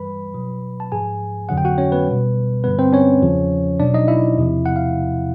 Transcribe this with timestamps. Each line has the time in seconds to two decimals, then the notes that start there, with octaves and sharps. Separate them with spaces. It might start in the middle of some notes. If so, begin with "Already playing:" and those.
Already playing: G2 E3 G3 B4 B5
0.34 B2 F#3
0.80 A5
0.92 G#2 F3 G#4 G#5
1.49 F2 D3 F#3 F#5
1.58 G5
1.65 F#4 F#5
1.78 C#4 C#5
1.92 B3 B4
2.07 B2 G3
2.64 G2 D3 G3 B3 B4
2.79 C4 C5
2.93 C#4 C#5
3.22 E2 C#3 F3
3.80 B2 F#3 D4 D5
3.94 D#4 D#5
4.08 E4 E5
4.37 E2 C3 F3
4.66 F#5
4.76 F5